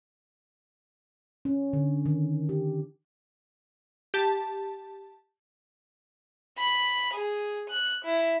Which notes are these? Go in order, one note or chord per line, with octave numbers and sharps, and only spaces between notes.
C#4
D3
D#3
G4
G4 A5
B5
G#4
F#6
E4